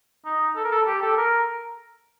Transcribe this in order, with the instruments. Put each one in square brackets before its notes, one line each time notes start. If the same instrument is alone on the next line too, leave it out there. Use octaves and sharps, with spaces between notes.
[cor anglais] D#4
A4
A#4
A4
G4
A4
A#4